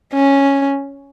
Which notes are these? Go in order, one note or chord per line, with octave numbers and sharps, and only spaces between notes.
C#4